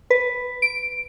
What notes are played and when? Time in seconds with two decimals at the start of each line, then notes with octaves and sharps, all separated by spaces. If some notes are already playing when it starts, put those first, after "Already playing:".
0.10 B4
0.62 D7